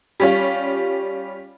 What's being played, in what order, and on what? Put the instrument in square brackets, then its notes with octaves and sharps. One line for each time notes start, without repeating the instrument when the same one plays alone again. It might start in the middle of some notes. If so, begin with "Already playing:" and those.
[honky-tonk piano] G3 C#4 F4